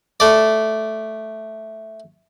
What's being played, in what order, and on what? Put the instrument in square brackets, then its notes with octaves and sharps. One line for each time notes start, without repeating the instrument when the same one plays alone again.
[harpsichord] A3 D5